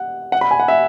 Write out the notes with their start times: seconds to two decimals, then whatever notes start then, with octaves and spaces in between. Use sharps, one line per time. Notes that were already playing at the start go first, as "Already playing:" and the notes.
Already playing: F#5
0.32 F#5
0.41 B5
0.51 G#5
0.60 F#5
0.68 E5